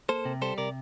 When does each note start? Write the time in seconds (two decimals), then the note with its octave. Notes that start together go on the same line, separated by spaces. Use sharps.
0.09 A#3 A4 C5
0.25 C3
0.42 G3 A4 C5
0.58 C3 A#4 D5